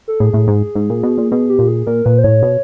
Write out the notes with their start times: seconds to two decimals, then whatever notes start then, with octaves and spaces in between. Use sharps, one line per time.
0.08 A4
0.20 A2 G#4
0.34 A2
0.48 G#2
0.75 G#2
0.90 A#2
1.03 B2
1.18 A#2
1.31 B2 G#4
1.50 G4
1.59 A#2
1.68 G#4
1.87 A#2 A#4
2.05 A#2 B4
2.18 C5
2.24 A2 C#5
2.43 B2